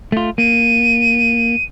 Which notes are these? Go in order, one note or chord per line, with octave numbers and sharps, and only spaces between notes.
A3 F4
A#3 D#7